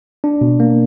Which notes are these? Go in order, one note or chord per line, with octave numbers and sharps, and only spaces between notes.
D4
B2
A#3